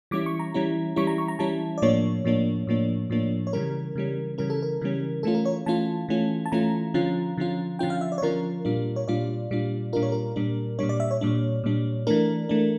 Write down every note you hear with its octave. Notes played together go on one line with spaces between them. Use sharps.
E3 G3 C#4 E4 D6
C#6
A#5
E3 G3 C#4 E4
E3 G3 C#4 E4 C#6
A#5
C#6
A#5
E3 G3 C#4 E4 A5
D5
A2 F3 A#3 D4 C#5
A2 F3 A#3 D4
A2 F3 A#3 D4
A2 F3 A#3 D4
C#5
C#3 E3 G3 C#4 A#4
C#3 E3 G3 C#4
C#3 E3 G3 C#4 A#4
A4
A#4
C#3 E3 G3 C#4
E3 A3 C#4 F4 A4
A#4
C#5
E3 A3 C#4 F4 A5
E3 A3 C#4 F4
A5
E3 A3 C#4 F4 A#5
D3 F3 C#4 F4
D3 F3 C#4 F4
D3 F3 C#4 F4 G5
F5
E5
D5
C#5
D3 F3 C#4 F4 A#4
A#2 G3 D4 F4
C#5
A#2 G3 D4 F4 D5
A#2 G3 D4 F4
A#2 G3 D4 F4 A#4
C#5
A#4
A#2 G3 D4
A#2 G3 D4 C#5
D5
E5
C#5
A#2 G3 D4
A#2 G3 D4
E3 A3 D4 A#4
E3 A3 D4